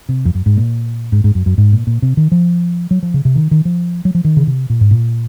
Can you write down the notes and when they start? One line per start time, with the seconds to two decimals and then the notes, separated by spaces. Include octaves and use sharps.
0.09 C3
0.25 F2
0.35 F#2
0.46 G#2
0.57 A#2
1.12 G#2
1.24 G#2
1.35 F#2
1.46 F#2
1.58 G#2
1.72 A#2
1.87 A#2
2.02 C3
2.17 D#3
2.32 F3
2.91 F#3
3.03 F3
3.14 C#3
3.25 C3
3.36 D#3
3.51 D#3
3.65 F3
4.05 F#3
4.15 F3
4.24 D#3
4.37 C#3
4.47 C3
4.70 A#2
4.81 G#2
4.91 A#2